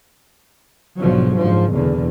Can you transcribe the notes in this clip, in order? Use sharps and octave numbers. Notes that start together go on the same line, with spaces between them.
B1 G#2 D3 F3 F#3
F#1 G#2 F3
E2 B2 D3